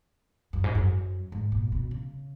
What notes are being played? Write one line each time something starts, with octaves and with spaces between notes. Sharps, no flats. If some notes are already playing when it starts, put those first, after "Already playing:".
F#2
G#2
F#2
G#2
A#2
B2
C#3